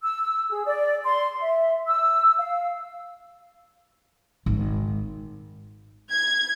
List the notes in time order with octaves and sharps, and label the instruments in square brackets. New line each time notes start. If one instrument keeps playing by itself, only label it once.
[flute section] E6
G#4
D5
C6
E5
E6
F5
[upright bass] G#1
[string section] G#6